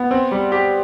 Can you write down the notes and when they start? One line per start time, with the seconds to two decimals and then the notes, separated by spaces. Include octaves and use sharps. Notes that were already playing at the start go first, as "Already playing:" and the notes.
Already playing: B3
0.11 C4
0.31 G3
0.52 G4